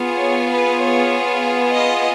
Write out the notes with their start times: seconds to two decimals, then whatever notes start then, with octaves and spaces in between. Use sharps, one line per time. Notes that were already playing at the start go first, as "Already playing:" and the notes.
Already playing: B3 F4 G#4
0.18 C#5
0.49 B4
0.80 C#5
1.72 D#5